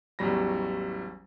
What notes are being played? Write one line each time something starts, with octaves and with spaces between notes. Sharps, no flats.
A1 E2 F#3 G3 B5 A#6